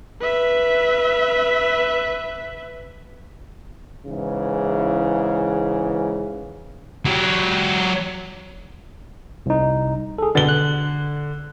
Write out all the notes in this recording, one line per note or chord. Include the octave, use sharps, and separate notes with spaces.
B4 E5
G#2 C#3 E3
F#3 G4
C2 D#4
G#4 A4
B2 D3 B3 A6 G7
F#6